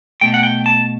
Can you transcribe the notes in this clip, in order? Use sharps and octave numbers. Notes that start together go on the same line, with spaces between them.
B2 A3 G5
F#5
G5
A5